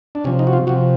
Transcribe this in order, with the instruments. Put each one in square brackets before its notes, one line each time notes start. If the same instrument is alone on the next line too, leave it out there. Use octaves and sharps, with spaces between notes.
[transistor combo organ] D4
C3 F3 C#4
D#4
F#4
F4
C3 F3 F#4